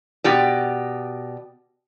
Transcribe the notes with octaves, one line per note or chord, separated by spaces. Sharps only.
B2 G4 D5